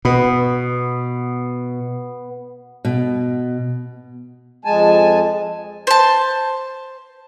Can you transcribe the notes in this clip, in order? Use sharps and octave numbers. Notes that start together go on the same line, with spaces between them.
B2 B3
B2
F2 G#3 G#5 A5
C5 A5